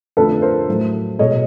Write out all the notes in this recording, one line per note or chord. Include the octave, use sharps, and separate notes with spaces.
F2 D3 F3 A3 A4 B4
A#4 C5
A2 F#3 A3
B2 G#3 C#5 D#5